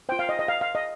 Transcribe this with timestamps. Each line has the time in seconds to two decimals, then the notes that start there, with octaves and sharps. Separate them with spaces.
0.09 F4 C5 G5
0.19 F5
0.29 D#5
0.39 D#5
0.48 F5
0.61 F5
0.75 D#5